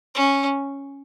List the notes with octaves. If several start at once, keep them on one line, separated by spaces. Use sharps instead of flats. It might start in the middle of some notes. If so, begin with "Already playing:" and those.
C#4